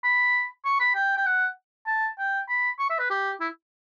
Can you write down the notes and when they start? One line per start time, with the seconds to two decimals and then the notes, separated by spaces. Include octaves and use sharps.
0.04 B5
0.65 C#6
0.80 B5
0.95 G5
1.17 G5
1.26 F#5
1.87 A5
2.18 G5
2.49 B5
2.79 C#6
2.90 E5
2.99 B4
3.10 G4
3.41 E4